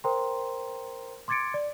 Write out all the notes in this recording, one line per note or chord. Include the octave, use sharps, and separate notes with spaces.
A#4 C5 G5 A#5 C6
C6 D6 G#6 A6 C#7 D7
D5